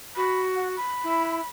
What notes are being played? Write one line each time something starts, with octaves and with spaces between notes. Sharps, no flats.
F#4 B5
F#5
B5
E4